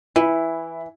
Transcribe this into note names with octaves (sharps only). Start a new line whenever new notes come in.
E3 E4